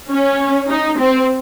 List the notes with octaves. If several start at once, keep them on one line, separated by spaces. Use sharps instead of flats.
C#4
D#4
C4